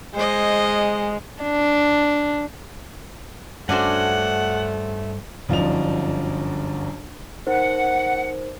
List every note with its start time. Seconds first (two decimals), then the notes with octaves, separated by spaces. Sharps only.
0.15 G#3 C5 D#5
1.43 D4
3.69 G2 A3 C#4 D4 F#4 C5 F#5
5.49 G1 F#2 F3 D4 D#4 F7
7.47 D#4 A#4 C5 F#5